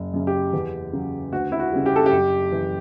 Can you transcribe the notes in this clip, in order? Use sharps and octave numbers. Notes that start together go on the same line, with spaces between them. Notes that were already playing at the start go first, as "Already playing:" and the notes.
Already playing: F#1
F#2 C#3
G4
E2
C#3 F#3
D2 F#4
E4
F#4
C#3 G3
G4
A4
G4
F#1
E3